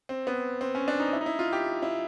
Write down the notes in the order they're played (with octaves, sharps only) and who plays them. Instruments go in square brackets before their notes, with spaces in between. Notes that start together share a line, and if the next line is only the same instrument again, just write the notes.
[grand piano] C4
B3
C4
C#4
D4
D#4
E4
D#4
E4
F4
G4
E4